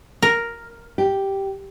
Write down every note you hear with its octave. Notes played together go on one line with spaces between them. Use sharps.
A#4
G4